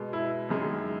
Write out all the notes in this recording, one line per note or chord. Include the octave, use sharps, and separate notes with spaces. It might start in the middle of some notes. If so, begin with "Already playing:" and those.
Already playing: B2 G#3
E4
F#2 D#3 G#3